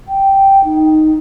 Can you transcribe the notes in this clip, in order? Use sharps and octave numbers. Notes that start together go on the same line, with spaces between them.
G5
D#4